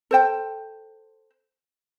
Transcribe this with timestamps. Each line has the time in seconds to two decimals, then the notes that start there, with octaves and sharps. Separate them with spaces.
0.11 A4 C5 G5